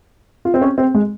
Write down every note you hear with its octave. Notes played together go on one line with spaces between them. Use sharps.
F4
C4
C#4
C4
G#3